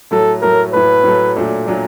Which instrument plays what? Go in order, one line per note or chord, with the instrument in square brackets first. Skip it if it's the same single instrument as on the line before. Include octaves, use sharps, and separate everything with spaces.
[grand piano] A2 F#3 A3 [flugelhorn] A4
[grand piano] A2 F#3 A3 [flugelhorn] A#4
[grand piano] A2 F#3 A3 [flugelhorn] B4
[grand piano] A2 F#3 A3
A#2 F#3 A3 D4
A#2 F#3 A3 D4